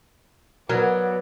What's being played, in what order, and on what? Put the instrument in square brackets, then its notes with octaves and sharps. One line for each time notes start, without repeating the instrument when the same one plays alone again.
[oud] F#3 [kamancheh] B3 D5 [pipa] A#4